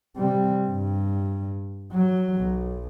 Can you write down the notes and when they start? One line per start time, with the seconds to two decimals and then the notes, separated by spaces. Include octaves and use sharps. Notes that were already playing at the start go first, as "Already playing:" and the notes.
0.16 C3 G3
0.67 G2
1.92 F#3
2.37 B1